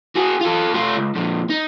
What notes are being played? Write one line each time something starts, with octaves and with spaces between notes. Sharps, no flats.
F#4 G#4
F4 A4
A3 F4
C#2
F2 A#2
D#4